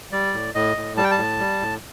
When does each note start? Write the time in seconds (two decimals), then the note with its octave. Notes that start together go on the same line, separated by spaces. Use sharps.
0.12 G3 D5
0.34 A2
0.54 A2 D#5
0.77 A2
0.97 G3 A5
1.04 G5
1.11 A5
1.18 A2
1.39 G3
1.61 A2